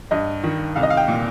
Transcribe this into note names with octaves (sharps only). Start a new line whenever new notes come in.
G2 D#5
D#3
C2 F5
D#5
F5
G5
A#2